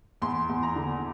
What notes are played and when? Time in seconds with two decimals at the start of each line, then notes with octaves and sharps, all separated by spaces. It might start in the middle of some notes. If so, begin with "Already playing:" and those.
0.22 E2 C6
0.49 E2
0.63 A#5
0.76 D3